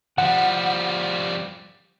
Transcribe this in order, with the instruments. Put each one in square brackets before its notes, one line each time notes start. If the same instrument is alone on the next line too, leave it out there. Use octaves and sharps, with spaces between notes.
[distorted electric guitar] F3 G3 [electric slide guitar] F#5